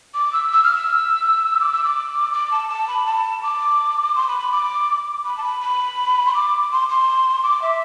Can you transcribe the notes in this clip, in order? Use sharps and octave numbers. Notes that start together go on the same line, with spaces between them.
D6
E6
E6
F6
E6
D6
E6
D6
D6
A5
A5
B5
A5
D6
C6
B5
B5
D6
B5
A5
B5
B5
C6
D6
C6
C6
D6
E5